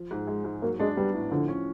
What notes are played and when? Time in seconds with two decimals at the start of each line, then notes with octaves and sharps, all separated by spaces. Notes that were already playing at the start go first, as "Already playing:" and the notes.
Already playing: F3
0.11 G#2
0.27 G#3
0.44 G#2
0.62 F#3 A#3
0.79 G#3 D4
0.97 G3 B3
1.14 A2
1.31 D3 F3
1.48 C#4